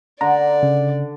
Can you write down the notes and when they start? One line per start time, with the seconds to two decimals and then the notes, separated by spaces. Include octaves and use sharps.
0.21 D3 D5 A#5
0.63 C#3